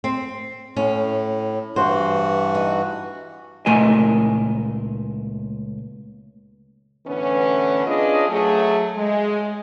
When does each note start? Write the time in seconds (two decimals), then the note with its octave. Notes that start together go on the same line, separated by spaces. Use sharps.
0.04 C4
0.76 A2 C#4
1.76 G2 E3 F#4 C5
2.55 D#4
3.66 C#2 A#2 A3 A#4 D#5 G#5
7.07 A2 D3 E3 B3 C#4
7.86 C#4 D4 F4 G#4 B4 D#5
8.29 F#3 A3 G#4
8.96 G#3